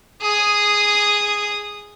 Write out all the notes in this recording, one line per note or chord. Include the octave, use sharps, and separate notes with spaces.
G#4 D#6